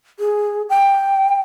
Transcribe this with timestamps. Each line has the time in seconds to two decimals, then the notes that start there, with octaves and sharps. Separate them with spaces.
0.19 G#4
0.70 G5